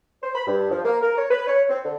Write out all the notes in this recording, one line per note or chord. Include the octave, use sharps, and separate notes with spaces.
C5
B5
G2
F3
A#3
A#4
C#5
B4
C#5
C4
D3